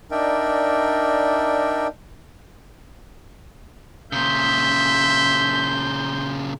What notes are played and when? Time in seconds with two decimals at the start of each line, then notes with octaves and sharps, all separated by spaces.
0.11 D4 D#4 A#4 D5 E5 G5
4.13 A#2 C#3 E5 C6 G6